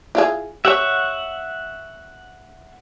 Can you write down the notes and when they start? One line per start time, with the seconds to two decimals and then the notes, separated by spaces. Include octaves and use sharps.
0.15 E4 F4 G#4
0.65 G4 C#5 E5 F#5 C#6